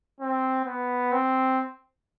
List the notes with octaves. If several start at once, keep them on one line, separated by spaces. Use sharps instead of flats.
C4
B3
C4